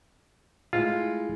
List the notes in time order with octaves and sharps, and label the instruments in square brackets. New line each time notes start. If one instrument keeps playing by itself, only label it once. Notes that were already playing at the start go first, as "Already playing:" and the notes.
[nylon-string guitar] G#3 A3 E4 [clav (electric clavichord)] F4